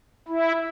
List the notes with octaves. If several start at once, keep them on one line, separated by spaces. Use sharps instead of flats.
E4